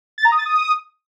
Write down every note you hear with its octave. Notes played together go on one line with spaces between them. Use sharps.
A6
A#5
D#6
A6
D#6